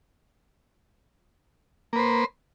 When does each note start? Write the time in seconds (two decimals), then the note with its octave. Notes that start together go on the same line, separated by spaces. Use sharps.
1.93 A#3
1.96 B4
1.99 C5